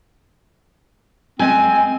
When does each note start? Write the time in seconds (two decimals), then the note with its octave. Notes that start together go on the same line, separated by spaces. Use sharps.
1.39 G#3 C4 G#5